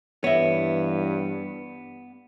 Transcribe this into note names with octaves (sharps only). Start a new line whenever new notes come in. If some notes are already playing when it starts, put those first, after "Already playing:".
G2 E3 B3 C#5 E5